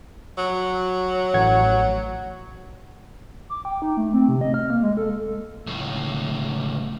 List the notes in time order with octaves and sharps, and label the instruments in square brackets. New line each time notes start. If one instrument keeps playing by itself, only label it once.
[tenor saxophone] F#3
[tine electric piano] A1 F#5 G#6
[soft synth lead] D6
G5
D#4
A3
C4
C3
D#5
F6
A#3
G#3
A4
[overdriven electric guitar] C#2 A2